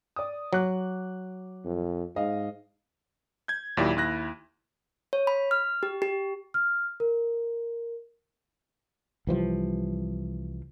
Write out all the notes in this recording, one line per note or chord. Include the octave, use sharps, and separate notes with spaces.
D5 D#6
F#3 D6 F#6
F2
G#2 D#5 F5
G6 G#6
D#2 A#2 F#3 E4 G4 D5
D#2 E4 F#6 A#6
C#5
B5
F6
G4
G4
F6
A#4
C2 E3 F3 G3